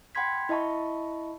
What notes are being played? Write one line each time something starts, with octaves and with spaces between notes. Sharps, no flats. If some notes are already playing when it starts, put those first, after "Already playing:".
F#5 G5 B5 C6 G#6 B6
E4 D#5 E5 A5 B5 C#6